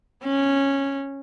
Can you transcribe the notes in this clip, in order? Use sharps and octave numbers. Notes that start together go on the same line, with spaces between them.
C#4